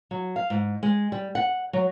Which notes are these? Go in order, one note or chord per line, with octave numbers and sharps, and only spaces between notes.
F#3
F5
G#2
G#3
G3
F#5
F#3